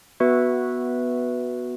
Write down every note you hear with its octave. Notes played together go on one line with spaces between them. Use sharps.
B3 F#4 B4 E5